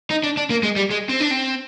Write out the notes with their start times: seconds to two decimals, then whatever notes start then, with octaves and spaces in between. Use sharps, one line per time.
0.10 D#4
0.23 D4
0.37 D4
0.50 A#3
0.63 G#3
0.76 G3
0.91 G#3
1.09 C4
1.21 D4
1.31 C4